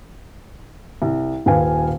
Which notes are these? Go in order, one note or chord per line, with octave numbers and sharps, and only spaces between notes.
C2
D#1 B4 F5 G#5